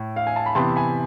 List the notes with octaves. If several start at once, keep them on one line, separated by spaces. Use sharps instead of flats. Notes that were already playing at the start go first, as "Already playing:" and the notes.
Already playing: A2
F5
G#5
A5
B5
C3 E3 B3 A5 C6
G#5 B5